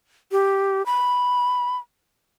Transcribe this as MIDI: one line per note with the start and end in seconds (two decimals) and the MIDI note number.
0.32 0.85 67
0.86 1.76 83